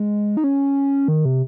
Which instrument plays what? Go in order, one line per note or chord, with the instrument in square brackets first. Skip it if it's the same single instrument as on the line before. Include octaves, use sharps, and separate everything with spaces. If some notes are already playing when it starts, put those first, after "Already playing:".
Already playing: [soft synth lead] G#3
D#4
C#4
D#3
C3